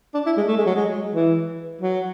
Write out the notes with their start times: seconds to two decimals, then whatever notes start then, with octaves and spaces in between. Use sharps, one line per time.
0.14 D4
0.26 E4
0.37 G#3
0.47 A3
0.56 G#3
0.66 F#3
0.75 G#3
1.15 E3
1.81 F#3